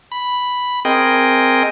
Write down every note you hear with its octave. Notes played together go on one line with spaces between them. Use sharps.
B5
C4 G#4 A#4 D#5 G5